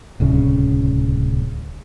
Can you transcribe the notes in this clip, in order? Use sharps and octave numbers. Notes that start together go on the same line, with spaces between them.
D1 C2 C#3 C#4